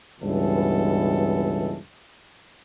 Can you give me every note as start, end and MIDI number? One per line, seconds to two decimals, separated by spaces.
0.21 1.77 37
0.21 1.77 43
0.21 1.77 47
0.21 1.77 52
0.21 1.77 69